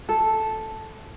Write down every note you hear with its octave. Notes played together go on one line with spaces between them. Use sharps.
A4